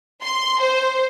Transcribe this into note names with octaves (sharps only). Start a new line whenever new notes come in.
C6
C5